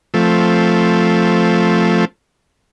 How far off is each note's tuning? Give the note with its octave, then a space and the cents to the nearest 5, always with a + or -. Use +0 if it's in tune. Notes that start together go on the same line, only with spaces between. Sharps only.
F3 +0 A3 +0 C4 +0